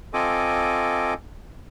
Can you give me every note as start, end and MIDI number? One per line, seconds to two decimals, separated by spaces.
0.14 1.14 60
0.14 1.14 65
0.14 1.14 69
0.14 1.14 75
0.14 1.14 80
0.14 1.14 86